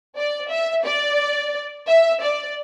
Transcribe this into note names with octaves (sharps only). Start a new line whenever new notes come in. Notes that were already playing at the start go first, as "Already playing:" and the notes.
D5
E5
D5
E5
D5